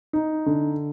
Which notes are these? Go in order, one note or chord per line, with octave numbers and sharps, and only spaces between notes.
D#4
D3